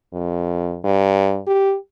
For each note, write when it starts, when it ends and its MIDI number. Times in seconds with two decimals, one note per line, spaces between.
0.13 0.79 41
0.84 1.40 43
1.47 1.76 67